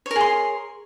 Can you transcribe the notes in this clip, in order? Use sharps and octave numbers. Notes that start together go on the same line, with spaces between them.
G#4 A#4 C#5 C6